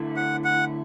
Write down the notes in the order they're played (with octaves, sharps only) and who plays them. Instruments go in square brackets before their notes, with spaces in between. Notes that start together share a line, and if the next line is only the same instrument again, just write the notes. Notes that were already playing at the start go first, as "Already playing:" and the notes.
Already playing: [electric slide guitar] D3 A3 E4
[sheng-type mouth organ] F#5
F#5